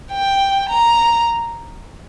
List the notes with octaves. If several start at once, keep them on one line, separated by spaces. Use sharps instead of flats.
G5
A#5